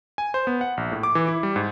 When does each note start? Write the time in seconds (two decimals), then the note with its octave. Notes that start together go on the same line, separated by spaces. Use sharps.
0.18 G#5
0.34 C5
0.47 B3
0.61 F#5
0.77 A#1
0.92 A2
1.03 D6
1.15 E3
1.28 E4
1.43 G3
1.56 G#2